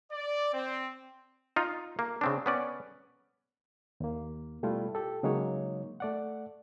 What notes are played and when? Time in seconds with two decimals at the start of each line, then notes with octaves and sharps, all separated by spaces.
0.12 D5
0.53 C4
1.56 D#4 F4
1.99 A#3
2.21 C#3 C4 D4
2.46 B3 C#4 D5
4.00 D#2 A#3
4.63 B2 G3 A3 E4 F4
4.95 G4 A4
5.23 C#3 F#3 G#3 A#3 D#4 C#5
6.00 A3 D5 F#5